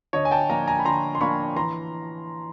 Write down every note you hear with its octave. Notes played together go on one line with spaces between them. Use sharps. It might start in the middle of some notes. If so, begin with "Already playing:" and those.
D3 C#5 D#5
G#5
G5 A5
F3 A#3 D4 G#5 A#5
G#5 A#5
B5
D3 A#5 C6
C6
F3 A#3 D4 B5 C#6
E3 A#5 C6